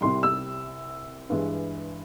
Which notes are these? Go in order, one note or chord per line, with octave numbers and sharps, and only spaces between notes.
C2 C3 G3 C6
E6
G2 E3 G#3